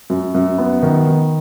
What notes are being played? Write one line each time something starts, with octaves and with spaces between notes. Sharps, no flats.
F#2
F#2
B3
D#3
D#3